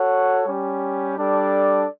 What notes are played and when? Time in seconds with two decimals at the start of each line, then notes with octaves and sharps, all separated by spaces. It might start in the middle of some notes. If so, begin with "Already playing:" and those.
Already playing: F#4 A4 C#5 F#5
0.47 G3 C#4 G4
1.17 G3 D4 A4 D5